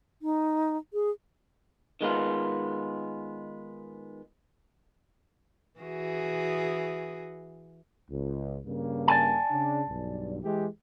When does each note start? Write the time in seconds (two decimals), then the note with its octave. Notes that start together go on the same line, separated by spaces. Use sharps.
0.22 D#4
0.93 G#4
2.01 D#3 G#3 B3 F4
5.79 E3 F#4 G#4
8.10 C#2
8.66 G2 C#3 A#3
9.08 D5 G#5 A5
9.51 C#3 D4
9.89 B1 G2
10.43 E3 G#3 G4